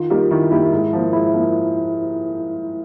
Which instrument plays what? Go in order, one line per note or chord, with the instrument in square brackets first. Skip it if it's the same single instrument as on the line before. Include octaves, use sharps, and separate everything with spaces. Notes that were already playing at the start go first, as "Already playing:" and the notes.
Already playing: [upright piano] D#3 [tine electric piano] F4
[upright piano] G3 A#3 D#4 G4
[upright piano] D#3 [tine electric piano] E4
[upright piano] G3 A#3 D#4 G4 [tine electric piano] E4
[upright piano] G#2
F3 A#3
[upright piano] G#2 [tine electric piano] E4
[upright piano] F3 A#3